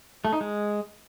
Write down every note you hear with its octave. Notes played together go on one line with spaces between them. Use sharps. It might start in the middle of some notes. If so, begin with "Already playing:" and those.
A3
D#4
G#3